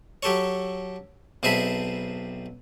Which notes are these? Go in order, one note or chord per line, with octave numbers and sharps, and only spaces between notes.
F#3 G4 A4 C#5
B1 C4 G#4 E5 A5 B5